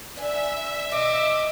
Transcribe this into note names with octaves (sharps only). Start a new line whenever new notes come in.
D4 B4 E5 G#5
B2 D#5 D6